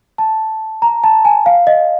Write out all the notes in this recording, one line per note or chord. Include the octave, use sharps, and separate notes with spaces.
A5
A#5
A5
G#5
F5
D#5